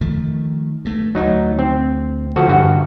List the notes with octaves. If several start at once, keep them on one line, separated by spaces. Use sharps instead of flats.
D#3 F3 A3
G2 A3
D2 F#3 A3 D#4
C4
D3 F3 F#4 A4
G2 F#4